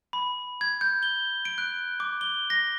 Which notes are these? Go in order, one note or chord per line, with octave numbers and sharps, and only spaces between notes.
B5
G#6
G6
G7
D7
F#6
D6
G7
A#6